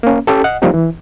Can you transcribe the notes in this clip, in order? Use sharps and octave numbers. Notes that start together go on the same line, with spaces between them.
A#3 C#4
C#4 G4 A4
D#5 F#5
F3 G3 A#3 C4 D#4 G4
E3